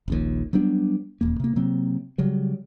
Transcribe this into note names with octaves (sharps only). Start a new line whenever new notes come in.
D#1 A#1 D#2
F#3 G3 B3 D4
D#1 E2 A#3
C3 A#3
C3 F#3 A#3 C4
C#3 F#3 G3